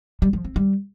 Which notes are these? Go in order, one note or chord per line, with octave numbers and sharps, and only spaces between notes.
G3
F3
C4
G3